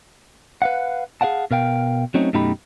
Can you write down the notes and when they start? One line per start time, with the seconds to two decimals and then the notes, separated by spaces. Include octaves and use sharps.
0.62 B4 F5 F#5
1.21 G#4 B4 F5 F#5 A5
1.51 B2 A#4 F5 G5
2.14 F#3 A3 C4 C#4 D#4
2.33 F#2 B2 A3 D#4 G4 B5